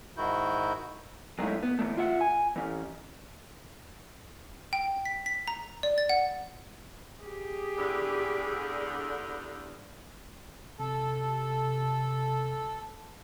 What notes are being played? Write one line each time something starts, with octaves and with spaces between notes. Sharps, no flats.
G#2 D#3 E4 F#4 G6
F#3 G#3 A3 C#4 D#4 E4
B3
D3 E3 A3
F4 E5 F#5
G#5
E3 C#4
G5
B6
B6
A#5
D5
A6
F#5
G4 G#4
E2 G2 D3
C3 A4